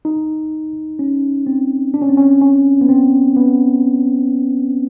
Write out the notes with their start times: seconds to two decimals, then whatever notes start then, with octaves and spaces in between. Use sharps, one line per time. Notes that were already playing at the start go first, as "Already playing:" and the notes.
0.05 D#4
0.99 C#4
1.47 C4
1.94 D4
2.02 C#4
2.09 C4
2.17 C#4
2.42 C#4
2.81 B3
2.89 C4
3.36 B3